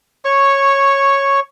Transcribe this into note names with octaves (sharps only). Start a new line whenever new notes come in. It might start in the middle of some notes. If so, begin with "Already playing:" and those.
C#5 C#6